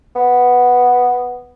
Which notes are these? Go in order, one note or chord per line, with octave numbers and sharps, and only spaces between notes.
B3